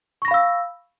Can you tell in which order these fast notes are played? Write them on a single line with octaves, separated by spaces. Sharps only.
C#6 A#6 B5 F5 E6